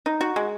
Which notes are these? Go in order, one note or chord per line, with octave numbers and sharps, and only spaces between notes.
D#4
F#4
G#3